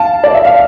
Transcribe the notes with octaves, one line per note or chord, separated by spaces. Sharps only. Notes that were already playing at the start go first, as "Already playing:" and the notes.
Already playing: F5 A5
D5
E5
F5